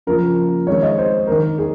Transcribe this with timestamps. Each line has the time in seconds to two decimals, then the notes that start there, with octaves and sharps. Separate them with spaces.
0.07 C#3 F3 A#3 A#4
0.67 D#3 G#3 C4 C#5
0.82 D#5
0.98 C5
1.27 D#3 A#3 A#4
1.59 G#4